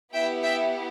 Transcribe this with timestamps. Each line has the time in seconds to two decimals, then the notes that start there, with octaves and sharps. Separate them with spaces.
0.13 B3 E4 G4 E5 G5
0.43 E5 G5